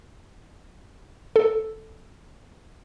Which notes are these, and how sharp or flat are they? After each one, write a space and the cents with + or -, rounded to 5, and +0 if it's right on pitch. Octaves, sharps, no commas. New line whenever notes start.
A4 +0